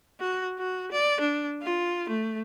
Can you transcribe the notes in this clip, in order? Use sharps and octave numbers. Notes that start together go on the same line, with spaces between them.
F#4
F#4
D5
D4
F4
A3